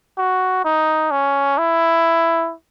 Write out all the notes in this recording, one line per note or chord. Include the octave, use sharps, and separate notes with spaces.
F#4
D#4
C#4
E4